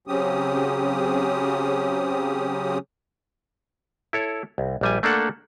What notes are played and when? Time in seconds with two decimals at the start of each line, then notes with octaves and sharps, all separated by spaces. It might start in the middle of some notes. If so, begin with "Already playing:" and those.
0.08 C#3 F#3 C4 C#4 G4 D#6
4.13 E4 A4 C#5
4.58 C2
4.81 A#1 G3 G#5
5.03 A3 A#3 D4 A4 F#5